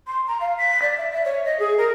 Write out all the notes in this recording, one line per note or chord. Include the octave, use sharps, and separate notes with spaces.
C6
A#5
F5
B6
D5
E5
E5
C#5
D#5
G#4
A#4